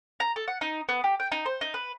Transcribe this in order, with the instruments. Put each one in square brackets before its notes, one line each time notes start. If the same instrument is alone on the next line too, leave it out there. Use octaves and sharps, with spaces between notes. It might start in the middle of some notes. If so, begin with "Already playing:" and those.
[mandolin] A#5
A4
F#5
D#4
B3
G4
G5
D#4
C5
D#4
B4